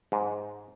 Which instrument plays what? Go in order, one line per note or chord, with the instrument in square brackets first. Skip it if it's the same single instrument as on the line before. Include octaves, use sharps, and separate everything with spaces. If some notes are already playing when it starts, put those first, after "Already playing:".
[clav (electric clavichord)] G#2